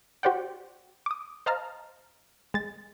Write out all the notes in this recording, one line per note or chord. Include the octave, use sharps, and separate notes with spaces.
F#4 G4 C5 D5 F#5 G5
D6 D#6
C5 D#5 F5 A5 A#5 F6
G#3 A6